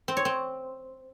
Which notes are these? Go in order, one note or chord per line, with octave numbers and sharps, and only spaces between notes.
C4
C#5
C4